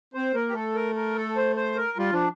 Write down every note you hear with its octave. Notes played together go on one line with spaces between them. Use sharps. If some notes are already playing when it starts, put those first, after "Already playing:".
C4 C5
A#3 A#4
G4
A3 A4
A#4
A#4
A4
C5
C5
A#4
G3 F4
F3 D4